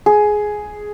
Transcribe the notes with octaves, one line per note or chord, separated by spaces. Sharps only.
G#4